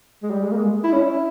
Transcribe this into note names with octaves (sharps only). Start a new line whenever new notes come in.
G#3
G3
G#3
A#3
G#3
E4
C#4
E4